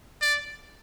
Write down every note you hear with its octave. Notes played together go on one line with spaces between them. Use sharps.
D5